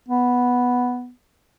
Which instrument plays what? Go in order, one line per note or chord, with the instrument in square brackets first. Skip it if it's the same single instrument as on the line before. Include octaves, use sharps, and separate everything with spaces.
[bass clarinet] B3